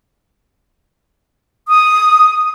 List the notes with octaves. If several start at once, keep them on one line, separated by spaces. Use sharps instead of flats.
D#6